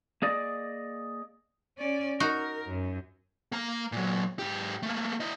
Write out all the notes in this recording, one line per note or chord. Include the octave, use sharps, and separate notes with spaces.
A#3 G#4 D5 D#5
C#4 D5
D#4 F#4 A#4
F#2
A#3 A#5
A#2 F#3
G#2 G4
A3 A#3
E4 D#5